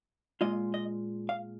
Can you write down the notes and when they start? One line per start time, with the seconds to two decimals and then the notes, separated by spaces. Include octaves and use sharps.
0.41 A#2 G#3 F4 D#5
0.74 D#5
1.29 F5